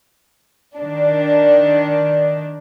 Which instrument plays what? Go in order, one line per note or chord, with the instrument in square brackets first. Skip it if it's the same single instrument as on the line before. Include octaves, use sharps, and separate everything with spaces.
[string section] D#3 D4